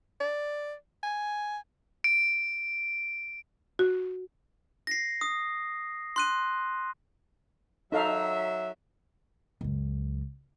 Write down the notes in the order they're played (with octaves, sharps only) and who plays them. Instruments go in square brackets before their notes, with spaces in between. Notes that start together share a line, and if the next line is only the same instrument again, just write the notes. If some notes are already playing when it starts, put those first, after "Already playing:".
[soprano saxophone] D5
G#5
[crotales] D7
[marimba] F#4
[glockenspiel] A#6 C7
D#6
C6 F#6 D#7
[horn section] F#3 E5 [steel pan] D#4 A4 F5
[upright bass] C#2 F#2